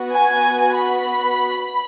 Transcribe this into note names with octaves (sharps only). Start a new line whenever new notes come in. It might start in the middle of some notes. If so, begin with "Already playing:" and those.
Already playing: B3 F#4
G#5
B5